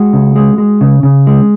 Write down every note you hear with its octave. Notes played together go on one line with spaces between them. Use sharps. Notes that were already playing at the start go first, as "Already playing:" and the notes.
Already playing: G#3 F#4
C#3
G#3
G#3
C#3
C#3
G#3